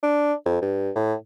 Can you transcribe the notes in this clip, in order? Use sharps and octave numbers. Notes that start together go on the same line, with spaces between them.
D4
F2
G2
A2